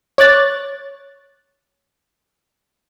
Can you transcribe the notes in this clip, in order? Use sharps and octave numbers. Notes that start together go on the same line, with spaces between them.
C#5 D6 F#6 A6